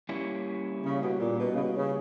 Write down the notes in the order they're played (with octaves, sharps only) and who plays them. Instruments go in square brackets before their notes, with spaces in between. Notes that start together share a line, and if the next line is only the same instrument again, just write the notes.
[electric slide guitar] G3 A#3 C#4 E4
[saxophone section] C#3
B2
A#2
B2
C#3
B2
C#3